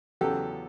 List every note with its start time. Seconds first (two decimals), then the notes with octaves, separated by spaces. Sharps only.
0.21 E2 C#3 F#3 G4 A4